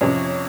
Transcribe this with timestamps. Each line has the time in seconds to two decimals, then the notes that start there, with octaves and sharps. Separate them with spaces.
0.01 F2 C3 F3 C#4